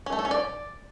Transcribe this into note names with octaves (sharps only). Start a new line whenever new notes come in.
C#4
A3
A4
C#4
D5